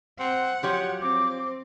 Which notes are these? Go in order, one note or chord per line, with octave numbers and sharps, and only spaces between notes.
C4 F#5
F3 F#3 G4 C#5
C4 D6